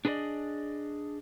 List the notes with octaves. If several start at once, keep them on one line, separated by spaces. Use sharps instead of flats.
D4 G#4 B4 C5 D5 D#5